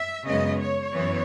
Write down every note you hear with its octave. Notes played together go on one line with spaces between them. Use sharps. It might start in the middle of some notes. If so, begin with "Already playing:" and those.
Already playing: E5
F#2 C#3 G#3 B3 D#5
C#5
F#2 E3 B3